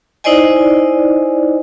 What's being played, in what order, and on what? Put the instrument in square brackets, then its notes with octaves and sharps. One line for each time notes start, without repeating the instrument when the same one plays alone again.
[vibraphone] D#4 E4 C5 D5 D#5 G#5